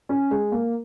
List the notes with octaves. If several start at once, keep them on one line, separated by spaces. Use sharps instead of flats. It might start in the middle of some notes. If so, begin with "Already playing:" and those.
C#4
G#3
A#3